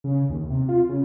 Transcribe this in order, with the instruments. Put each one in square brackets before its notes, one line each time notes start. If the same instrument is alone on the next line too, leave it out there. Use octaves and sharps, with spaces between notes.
[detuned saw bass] C#3
D#2
C3
F4
C#3